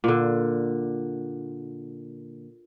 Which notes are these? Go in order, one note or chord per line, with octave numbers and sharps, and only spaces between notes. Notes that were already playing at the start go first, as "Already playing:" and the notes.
A#2 D3